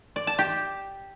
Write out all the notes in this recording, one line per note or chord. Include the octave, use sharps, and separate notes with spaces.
D5
A5
G4